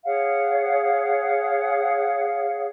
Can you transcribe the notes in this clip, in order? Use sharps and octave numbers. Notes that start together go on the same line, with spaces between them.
G#4 C#5 F5 F#5